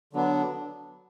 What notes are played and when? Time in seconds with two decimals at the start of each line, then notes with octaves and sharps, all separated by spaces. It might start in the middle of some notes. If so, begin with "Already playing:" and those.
0.13 D3 F#3 B3 D4